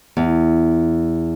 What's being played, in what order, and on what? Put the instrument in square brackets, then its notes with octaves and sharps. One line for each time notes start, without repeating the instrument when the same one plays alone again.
[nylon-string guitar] E2